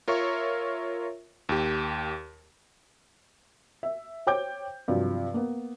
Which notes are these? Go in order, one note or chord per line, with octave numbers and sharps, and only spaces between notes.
F4 A#4 C#5 E5 C#6
D#2 G4
E5
C5 C#5 G5 D6 G6
G2 C3 F3 F#3
A#3 B3